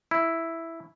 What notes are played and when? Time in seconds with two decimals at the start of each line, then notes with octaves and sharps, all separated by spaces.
0.11 E4